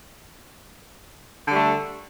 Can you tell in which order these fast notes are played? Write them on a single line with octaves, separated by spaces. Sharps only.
D3 G3 A3